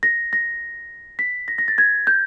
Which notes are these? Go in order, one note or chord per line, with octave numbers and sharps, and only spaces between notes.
A#6
A#6
B6
A#6
A#6
A6
G#6
G6